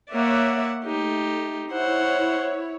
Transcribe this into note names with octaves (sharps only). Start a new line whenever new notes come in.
A#3 C#5 D5 E5 F#5
A3 D#4 G4
E4 C5 C#5 F#5